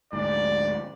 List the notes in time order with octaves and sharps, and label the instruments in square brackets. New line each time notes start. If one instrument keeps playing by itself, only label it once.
[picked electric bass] D2 G#2 [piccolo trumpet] D5